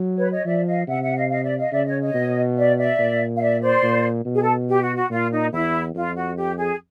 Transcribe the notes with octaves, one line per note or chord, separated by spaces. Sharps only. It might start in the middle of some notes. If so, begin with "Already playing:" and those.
Already playing: F#3
B4 C#5
C#5 D#5
F3 D5 E5
D#5 F5
C3 E5 F#5
E5 F#5
D#5 F5
D#5 F5
D5 E5
D#5 F5
C#3 D5 E5
C#5 D#5
C#5 D#5
B2
D5 E5
D5 E5
A#2
F5
D5 E5
C5 D5
A#2
B2
G#4
A4
G4
F#4
F#4
A#2 F4
D#4
E2 E4
F2 F4
F#4
G4
G#4